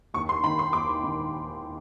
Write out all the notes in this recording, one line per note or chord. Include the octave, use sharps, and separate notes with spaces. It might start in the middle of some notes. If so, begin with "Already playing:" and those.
D#2 C#6
C6
D#3 B5
C6
D#2 D6
D#3